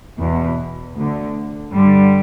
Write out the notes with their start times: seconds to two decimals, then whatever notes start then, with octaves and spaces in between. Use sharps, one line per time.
0.19 E2 B2
0.97 D2 D3
1.73 G2 D3 G3